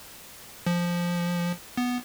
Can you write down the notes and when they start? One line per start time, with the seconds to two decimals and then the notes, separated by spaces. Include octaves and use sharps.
0.66 F3
1.78 B3